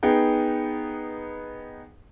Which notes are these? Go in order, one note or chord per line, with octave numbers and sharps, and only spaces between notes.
B3 D#4 G#4 G5